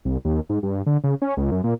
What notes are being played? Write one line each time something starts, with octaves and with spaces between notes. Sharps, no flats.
C2
D#2
G#2
G2
D3
C#3
C#4
C#2
F#2
A#2